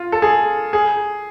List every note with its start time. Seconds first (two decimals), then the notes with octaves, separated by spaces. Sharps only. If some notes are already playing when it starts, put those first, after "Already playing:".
Already playing: F4
0.12 A4
0.22 G#4
0.73 G#4